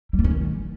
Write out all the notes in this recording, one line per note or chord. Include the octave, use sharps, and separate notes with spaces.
G3
B3
C#4
D#3